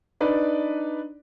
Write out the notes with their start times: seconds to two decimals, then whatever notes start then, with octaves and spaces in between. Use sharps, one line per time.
0.21 D4 D#4 B4 D5